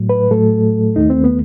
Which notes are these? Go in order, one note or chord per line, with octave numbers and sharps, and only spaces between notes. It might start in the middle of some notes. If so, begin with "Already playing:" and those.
Already playing: A2 F#3 A3
B4
A2 F#3 A3 A4
D#2 D#3 A3 D#4
C4
B3